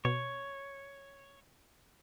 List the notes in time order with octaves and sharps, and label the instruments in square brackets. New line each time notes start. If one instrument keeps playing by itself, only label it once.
[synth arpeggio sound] B2 [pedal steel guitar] C#5